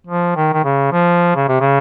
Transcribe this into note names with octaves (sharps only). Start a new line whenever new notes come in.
F3
D#3
D#3
C#3
F3
C#3
C3
C#3